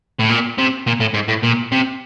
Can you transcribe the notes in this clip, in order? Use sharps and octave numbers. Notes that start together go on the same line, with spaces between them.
A2
A#2
C3
A#2
A2
G#2
A2
A#2
C3